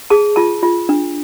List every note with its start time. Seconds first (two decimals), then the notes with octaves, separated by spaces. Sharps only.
0.10 G#4 A5
0.36 F4 A5
0.63 F4
0.89 D4